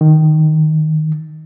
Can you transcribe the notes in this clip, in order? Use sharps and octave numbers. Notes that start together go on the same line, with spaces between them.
D#3